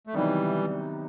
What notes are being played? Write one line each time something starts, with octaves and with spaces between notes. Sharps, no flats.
A3
C3 D#3 E3 F#3 G3 B3 D#4